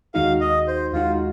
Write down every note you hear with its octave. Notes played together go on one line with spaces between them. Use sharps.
D#2 D#3 G#3 D#4 F#4 F5
D#5
C5
D#2 D#3 G#3 D#4 F4 F#4